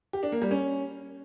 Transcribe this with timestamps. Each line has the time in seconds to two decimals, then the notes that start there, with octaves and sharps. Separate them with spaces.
0.13 G4
0.23 D4
0.32 A#3
0.42 G3
0.51 C#4